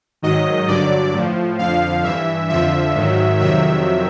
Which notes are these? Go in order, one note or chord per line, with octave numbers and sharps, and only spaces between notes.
G#2 D#3 F#3 D#5
G2 D3 F#3 D5
A2 F3
F2 D3 F3 F5
G2 E3 E5
F2 D3 F3 E5
G#2 D#3 F#3
F2 C3 D#3 F#3 E5